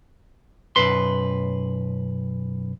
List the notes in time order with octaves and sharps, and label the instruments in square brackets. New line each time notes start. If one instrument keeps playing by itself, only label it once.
[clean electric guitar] B1 F#2 B4 C6